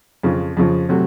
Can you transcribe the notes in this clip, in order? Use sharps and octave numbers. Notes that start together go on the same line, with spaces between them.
F2 C#3 F3
F2 C#3 F3
C3 F#3 A3